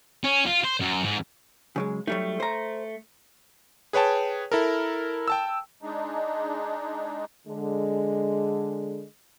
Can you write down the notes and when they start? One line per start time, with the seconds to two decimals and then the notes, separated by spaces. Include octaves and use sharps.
0.24 C#4
0.46 F4
0.64 C5
0.80 F#2
1.04 G#2
1.76 C#3 F#3 G#3
2.07 F#3 G3 A3 D#4
2.40 C5 A#5
3.93 G#4 B4 C#5 G5 A5
4.52 E4 A4 A#4
5.28 G5 A5 E6
5.82 G#3 D4 D#4
7.48 D3 G#3